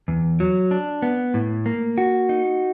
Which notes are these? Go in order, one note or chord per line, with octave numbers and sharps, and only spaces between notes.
E2
F#3
D4
B3
A2
A#3
F#4
D#4